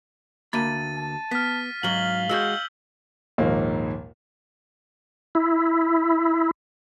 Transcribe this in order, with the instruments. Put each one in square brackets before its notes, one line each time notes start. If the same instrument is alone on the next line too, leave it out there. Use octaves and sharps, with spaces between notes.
[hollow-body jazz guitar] D2 A#3 B5 [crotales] A6 D#7
[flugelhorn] A5
[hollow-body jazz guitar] B3 [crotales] F6 B6
[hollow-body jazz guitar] G#2 F#3 [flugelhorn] F5 [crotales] F#7 G7
[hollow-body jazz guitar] G#3 F#4 G#4 [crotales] E6 G6
[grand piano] A#1 D#2 G#2 A#3 D#4
[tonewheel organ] E4